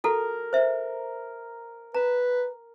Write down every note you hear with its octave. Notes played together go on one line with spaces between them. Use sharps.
F#4 A4 A#4
C5 E5
B4 A#5